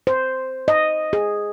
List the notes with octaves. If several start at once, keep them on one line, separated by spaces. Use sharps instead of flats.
C5
D#5
G#4